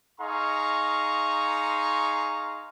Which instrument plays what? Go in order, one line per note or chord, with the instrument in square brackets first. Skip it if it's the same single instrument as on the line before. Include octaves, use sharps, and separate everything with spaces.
[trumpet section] D#4 G#4 F5 A#5 C6 C#6